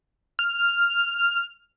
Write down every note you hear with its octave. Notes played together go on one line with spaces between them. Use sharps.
F6